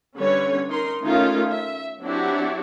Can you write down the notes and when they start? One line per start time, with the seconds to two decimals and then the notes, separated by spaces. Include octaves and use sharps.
0.16 D3 G3 C#4 B4 C#5
0.68 D#4 A#4 C6
1.01 D#3 A3 C#4 D#4 F4 A#4
1.49 E5
2.01 F#3 C4 D4 E4 F#4 G4